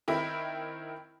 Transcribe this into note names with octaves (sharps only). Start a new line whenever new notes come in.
D#3 C4 E4